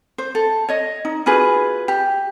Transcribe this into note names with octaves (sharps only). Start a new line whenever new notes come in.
C5
A4
C#5 D#5
D#4
F4 F#4 G#4 B4
G4